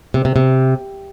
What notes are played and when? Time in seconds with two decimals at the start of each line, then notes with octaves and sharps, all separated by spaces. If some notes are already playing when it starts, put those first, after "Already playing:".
0.14 C3
0.25 C3
0.36 C3